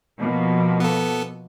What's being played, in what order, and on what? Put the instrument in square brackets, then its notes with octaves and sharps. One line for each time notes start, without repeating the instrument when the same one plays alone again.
[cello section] B2 F3 A#3
[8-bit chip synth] B3 A4